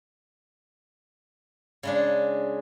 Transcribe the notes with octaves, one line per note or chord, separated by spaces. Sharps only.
C#3 G#3 D4